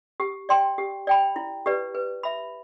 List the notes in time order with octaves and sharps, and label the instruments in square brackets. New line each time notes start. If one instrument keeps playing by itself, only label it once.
[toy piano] G4
D5 G5 C6
G4
D5 G5 B5
E4
G4 B4 D5
B4
E5 B5